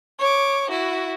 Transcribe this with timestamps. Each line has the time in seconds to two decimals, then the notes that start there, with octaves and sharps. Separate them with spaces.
0.19 C#5 D6
0.68 E4 F#4